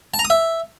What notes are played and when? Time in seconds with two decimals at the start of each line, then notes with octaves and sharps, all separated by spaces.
0.14 A5
0.19 A#5
0.25 D#6
0.30 E5